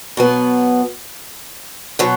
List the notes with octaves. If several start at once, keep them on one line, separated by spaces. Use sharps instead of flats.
B2 F#3 B3
B2 F#3